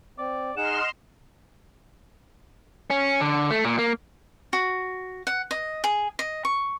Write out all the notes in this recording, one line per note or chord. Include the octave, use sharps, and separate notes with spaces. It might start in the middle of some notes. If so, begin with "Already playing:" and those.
C4 D5
D#4 G#4 D#5 F#5 C6 F6 E7
C#4
D3
A3
A#2
A#3
F#4
F#5
D#5
G#4
D#5
C#6